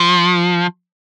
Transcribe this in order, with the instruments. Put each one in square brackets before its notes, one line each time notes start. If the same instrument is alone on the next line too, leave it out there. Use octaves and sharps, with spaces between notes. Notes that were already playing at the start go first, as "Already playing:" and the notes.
Already playing: [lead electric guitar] F3